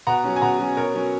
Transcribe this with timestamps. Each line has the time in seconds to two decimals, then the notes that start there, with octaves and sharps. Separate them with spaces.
0.07 B2 F#5 A#5
0.24 F#3 C#4
0.36 G#5
0.41 B2 F#5 A#5
0.59 F#3 C#4
0.77 B2 A#4 C#5
0.95 F#3 C#4